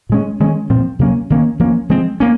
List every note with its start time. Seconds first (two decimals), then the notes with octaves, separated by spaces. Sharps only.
0.09 A#2 G#3 C#4
0.40 D#3 G#3 C#4
0.70 A#2 F3 C4
0.99 C3 F#3 A#3 C#4
1.30 D#3 A#3 C#4
1.59 F3 A#3 C#4
1.89 F3 G#3 C4
2.20 A#3 C#4